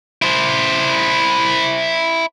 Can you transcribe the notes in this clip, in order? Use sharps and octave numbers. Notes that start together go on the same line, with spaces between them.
E4 C5